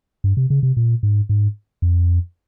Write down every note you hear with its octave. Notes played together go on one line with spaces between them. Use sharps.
G2
C3
C#3
C3
A#2
G#2
G#2
F2